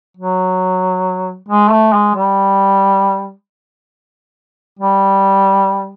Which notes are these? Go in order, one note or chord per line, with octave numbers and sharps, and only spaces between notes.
F#3
G#3
A3
G#3
G3
G3